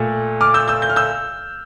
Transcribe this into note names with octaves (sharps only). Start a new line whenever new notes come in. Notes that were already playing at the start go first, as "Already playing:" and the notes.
Already playing: A#2 A3
D6 F6
E6 G6
E6 G6
G6
F6
E6 G6